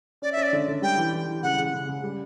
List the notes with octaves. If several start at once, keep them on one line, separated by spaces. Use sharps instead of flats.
C#4 D5
C#4 E5
D5
D3
D3
G3 G5
E3
E3
E3
C#3 F#5
C#3
C#3
C#3
G3